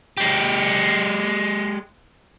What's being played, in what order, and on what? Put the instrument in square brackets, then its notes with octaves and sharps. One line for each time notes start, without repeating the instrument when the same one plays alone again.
[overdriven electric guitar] G#3 G4